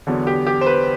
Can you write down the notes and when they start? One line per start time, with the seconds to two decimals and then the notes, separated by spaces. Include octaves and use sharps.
0.07 E2 D3 F#3 B3
0.27 G4
0.47 G4
0.61 C5
0.67 B4